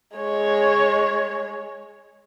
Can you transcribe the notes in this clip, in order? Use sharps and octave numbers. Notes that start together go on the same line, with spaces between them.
G#3 C#5